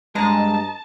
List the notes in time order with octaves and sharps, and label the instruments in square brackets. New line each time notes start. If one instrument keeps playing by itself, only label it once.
[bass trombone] G2 [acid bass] G#3 [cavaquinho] D#5 A#5 [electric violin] A5